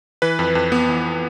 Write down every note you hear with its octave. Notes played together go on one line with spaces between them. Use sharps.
E3 B4
F2
F2
B3
E3